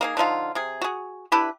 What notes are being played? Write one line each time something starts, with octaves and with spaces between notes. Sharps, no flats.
A#3 D#4 G#4
D3 F3 D#4 F4
C3 G#4
F#4 G#4
D4 E4 G4 B4